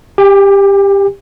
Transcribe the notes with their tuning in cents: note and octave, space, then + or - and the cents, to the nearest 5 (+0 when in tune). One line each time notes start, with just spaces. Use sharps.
G4 +15 G#5 -45